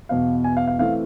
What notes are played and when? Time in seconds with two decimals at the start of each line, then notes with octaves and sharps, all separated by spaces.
0.09 E2 B2 B3 F5
0.44 G#5
0.57 F5
0.67 F5
0.79 E3 A3 C4 F5